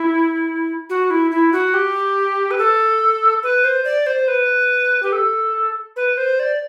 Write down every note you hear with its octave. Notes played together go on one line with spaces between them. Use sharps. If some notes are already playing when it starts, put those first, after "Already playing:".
Already playing: E4
F#4
E4
E4
F#4
G4
B4
A4
B4
C5
D5
C5
B4
G4
A4
B4
C5
D5